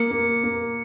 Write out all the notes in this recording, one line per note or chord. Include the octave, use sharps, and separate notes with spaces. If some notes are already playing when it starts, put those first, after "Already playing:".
Already playing: A#3 C#7
A#3
A#3